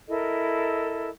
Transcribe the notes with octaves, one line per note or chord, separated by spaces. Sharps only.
E4 A4 A#4 D#5